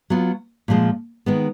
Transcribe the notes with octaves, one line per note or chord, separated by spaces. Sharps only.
F#3 B3 F4
A#2 F3 G#3
D#3 G#3 B3